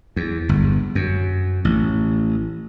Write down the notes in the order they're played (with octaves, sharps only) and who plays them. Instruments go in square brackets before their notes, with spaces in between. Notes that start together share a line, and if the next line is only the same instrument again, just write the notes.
[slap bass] E2
G1
F#2
A1